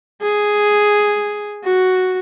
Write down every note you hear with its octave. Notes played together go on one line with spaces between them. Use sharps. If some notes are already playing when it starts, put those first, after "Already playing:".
G#4
F#4